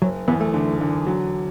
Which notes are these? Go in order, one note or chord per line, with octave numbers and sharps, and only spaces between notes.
F#1 F#3
E2 B3
A3
D3
D3
F#3